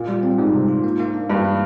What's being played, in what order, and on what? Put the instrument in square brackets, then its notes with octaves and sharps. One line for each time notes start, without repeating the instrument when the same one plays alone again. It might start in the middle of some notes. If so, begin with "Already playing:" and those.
Already playing: [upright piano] A#2
[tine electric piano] G3
C4
[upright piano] G#2 [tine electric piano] G3
[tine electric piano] C3
F4
A#3
A#3
D4
[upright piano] G2 [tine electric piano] D4
[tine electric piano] A#3